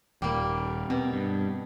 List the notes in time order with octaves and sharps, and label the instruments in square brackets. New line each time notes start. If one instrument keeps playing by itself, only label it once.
[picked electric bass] D#1 [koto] G3 A#3
[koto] B2 [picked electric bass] C4
[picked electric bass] G2